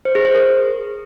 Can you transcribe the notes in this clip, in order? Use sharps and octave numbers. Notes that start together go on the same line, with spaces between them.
C5
G#4
C5
A#4